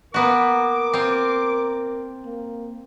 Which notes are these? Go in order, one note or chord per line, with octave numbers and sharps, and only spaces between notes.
A#3 B3 F#4 A#4 D6
C4 F4
A#3